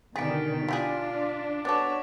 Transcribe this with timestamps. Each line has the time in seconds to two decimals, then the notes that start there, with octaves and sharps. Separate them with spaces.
0.16 B2 D3 D#3 G3 G#4 A6 B6 D7
0.68 D4 E4 F4 G4 G#4
1.65 B3 F#4 A4 C#5 D6 A6